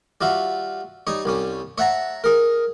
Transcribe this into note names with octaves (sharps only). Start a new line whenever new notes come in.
G3 F4 F#4 E5
G3 D#4 C#5
C2 G3 C#4
C#5 E5 F#5 A5 A#5
G#4 A#4